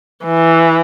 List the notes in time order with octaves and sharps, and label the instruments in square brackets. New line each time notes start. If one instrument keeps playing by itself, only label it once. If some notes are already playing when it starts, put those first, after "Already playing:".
[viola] E3